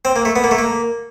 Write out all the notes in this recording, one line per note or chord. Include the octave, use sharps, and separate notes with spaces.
C4
A#3
A3
B3
A#3
A3
A#3